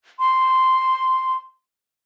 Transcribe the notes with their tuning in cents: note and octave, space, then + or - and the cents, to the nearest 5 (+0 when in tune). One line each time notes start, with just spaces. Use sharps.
C6 -5